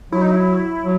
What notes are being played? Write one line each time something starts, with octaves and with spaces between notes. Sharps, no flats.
F#3 E4
D#4
E4
F#3